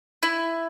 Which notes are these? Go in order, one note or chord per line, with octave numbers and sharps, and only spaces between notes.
E4